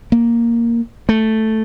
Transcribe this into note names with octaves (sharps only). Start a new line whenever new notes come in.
A#3
A3